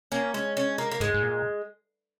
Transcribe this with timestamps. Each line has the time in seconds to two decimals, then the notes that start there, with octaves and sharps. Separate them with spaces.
0.12 A#3 C#4
0.34 G#3 C#4
0.57 C#4
0.78 A#3
0.91 A#3
1.00 G#2 G#3
1.14 G#2
1.22 A#2